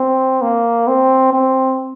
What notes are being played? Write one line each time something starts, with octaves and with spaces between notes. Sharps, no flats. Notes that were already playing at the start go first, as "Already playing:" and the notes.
Already playing: C4
A#3
C4
C4